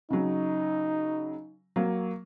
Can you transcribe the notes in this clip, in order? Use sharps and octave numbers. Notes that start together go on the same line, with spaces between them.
C#3 F#3 D#4
F#3 A#3